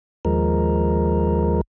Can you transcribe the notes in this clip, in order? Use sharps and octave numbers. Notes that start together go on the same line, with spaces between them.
D#2 F3 G#3 A#4